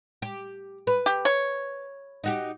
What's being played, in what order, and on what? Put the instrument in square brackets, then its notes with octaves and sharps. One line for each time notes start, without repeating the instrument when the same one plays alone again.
[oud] G4
B4
[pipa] G4
C#5
[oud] D#4 F#4 G4